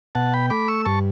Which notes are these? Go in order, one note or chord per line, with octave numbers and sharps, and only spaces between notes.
B2 F#5 A5
G5 B5
A3 B5 D6
C#6 E6
G2 A5 C#6